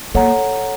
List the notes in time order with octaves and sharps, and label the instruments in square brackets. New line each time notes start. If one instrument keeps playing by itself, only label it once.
[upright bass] A#3 [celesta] A4 C#5 F#5 A#5